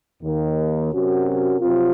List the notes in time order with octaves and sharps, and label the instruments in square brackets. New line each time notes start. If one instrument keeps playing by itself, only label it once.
[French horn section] D#2 D#3 A#3
C3 F#3 C#4 F#4 A#4
C3 F#3 C4 F4